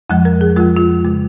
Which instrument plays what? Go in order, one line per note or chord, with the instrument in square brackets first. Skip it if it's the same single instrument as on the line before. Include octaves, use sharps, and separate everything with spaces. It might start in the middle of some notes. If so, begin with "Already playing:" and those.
[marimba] F2 F3 G#3 F#5
A#4
G#4
F2 F3 G#3 F4
F4
C#3 G#3